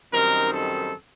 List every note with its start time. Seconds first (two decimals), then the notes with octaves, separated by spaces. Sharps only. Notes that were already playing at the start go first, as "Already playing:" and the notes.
0.11 F#2 D#3 G3 C4 D#4 A#4
0.52 A4